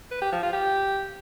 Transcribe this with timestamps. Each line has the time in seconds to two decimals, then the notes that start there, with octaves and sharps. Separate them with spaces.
0.11 B4
0.22 G4
0.32 F3
0.42 F4
0.53 G4